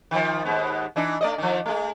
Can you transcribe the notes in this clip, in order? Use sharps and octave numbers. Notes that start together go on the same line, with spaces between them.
D#3 F3
D#2 G#2 B3
E3 D4 D#4
A3 D5 D#5
D#3 F3
G#3 A3